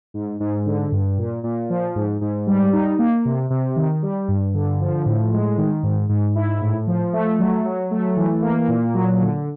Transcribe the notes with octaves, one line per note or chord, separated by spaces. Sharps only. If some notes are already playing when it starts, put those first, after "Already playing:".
G#2
G#2
D3
G2
A#2
A#2
F3
G#2
G#2
G3
D#4
A#3
C3
C3
D#3
G3
G2
D3
F3
A2
G#3
D#3
G#2
G#2
E4
A2
F3
A3
F#3
F#3
A3
E3
A#3
A#2
F#3
D3